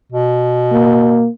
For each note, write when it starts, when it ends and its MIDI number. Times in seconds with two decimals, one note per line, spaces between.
0.12 1.26 47
0.72 1.28 58